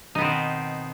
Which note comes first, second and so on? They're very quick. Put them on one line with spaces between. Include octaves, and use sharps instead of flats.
D#4 B3 C4 D#3 B2